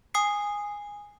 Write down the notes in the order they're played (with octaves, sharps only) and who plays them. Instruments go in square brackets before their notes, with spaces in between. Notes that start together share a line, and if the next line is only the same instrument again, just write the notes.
[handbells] G#5 D#6 C7